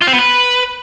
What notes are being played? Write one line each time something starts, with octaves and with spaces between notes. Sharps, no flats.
F4
C4
B3
B4